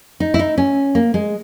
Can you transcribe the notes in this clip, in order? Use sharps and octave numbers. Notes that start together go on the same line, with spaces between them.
D#4
E4
D#4
C#4
A#3
G#3